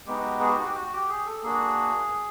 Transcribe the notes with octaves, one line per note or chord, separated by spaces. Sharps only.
G#3 B3 D#4 F#4 G4
G#4
G4
F#4
G4
F#4
G4
G#4
A4
A#3 D4 F#4 G#4